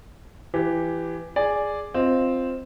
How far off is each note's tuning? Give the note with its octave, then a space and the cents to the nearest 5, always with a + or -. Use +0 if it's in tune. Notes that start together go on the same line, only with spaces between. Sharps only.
E3 +15 G4 +0
G#4 +0 D5 +0
C4 +0 F4 +0 D#5 +0